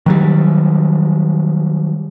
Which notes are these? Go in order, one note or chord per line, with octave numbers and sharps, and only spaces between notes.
D#3 F#3 G3